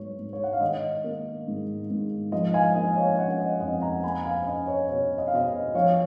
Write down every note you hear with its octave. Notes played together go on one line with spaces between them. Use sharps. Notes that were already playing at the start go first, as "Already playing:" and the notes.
Already playing: G#2 F#3 B3 C#5
G#2
C#5
F#5
F5
D#3 D#5
A#3
G#2
G#2
F3 D#5
F5 G#5
A#3 D#5
C#5 F5
C#4 D#5 F#5
D#5
F2 D#5 F#5
F#5 A#5
A#3 G#5 B5
F5 G#5
C#4 D#5
C#5
B2 C#5
D#5
F5
B2 D#5
F3 C#5 F5